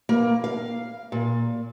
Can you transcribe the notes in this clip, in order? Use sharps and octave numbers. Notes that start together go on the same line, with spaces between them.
A#3
F5
A#2